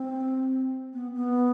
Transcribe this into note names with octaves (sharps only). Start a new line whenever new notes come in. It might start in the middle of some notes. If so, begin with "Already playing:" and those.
Already playing: C4
B3
B3